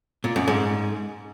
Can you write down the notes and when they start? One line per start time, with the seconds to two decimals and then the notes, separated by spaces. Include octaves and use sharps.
0.24 A#2
0.36 F#2
0.48 G#2